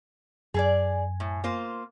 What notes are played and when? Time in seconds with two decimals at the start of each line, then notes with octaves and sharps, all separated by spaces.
0.54 F#2 G#4 A4 D5 G#5
1.20 A2
1.44 A#3 F4 C5